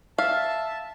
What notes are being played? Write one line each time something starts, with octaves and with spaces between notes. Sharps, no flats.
E5 F5 A5